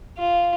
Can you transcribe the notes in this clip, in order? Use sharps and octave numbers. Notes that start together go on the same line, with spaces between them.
F4